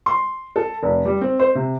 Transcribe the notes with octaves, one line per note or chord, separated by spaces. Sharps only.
C6
A4
F1
G3
C4
C5
C3